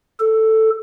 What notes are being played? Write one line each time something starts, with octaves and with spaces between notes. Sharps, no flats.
A4